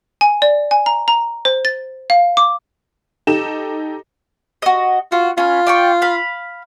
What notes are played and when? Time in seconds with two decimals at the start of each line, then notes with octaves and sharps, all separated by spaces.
0.21 G#5
0.42 D5
0.71 G#5
0.86 A#5
1.08 A#5
1.45 C5
1.65 A6
2.10 F5
2.37 D6
3.27 D#4 G4 A4 E7
4.62 F#4 D#5
5.12 F4 F#4
5.38 C#4 F4 B5
5.67 D5 G5 C#6
6.02 F5 B5